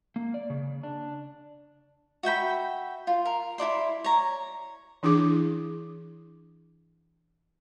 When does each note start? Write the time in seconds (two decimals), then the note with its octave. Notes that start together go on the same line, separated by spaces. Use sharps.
0.16 A#3
0.34 D5
0.50 C#3
0.83 D4
2.23 F#4 E5 G5 B5
3.07 F4
3.25 A#4
3.58 E4 A4 D5 C6
4.04 C#5 A#5
5.03 E3 D4 E4 G#4 D6